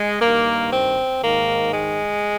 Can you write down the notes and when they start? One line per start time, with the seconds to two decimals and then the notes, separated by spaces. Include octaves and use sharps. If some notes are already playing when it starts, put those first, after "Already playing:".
Already playing: G#3
0.21 G2 D#3 A#3
0.72 C4
1.22 G#2 D#3 A#3
1.73 G#3